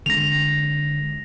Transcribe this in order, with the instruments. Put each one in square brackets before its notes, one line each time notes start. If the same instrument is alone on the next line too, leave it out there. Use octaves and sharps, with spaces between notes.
[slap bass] D3 G#3 [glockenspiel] A#6 F7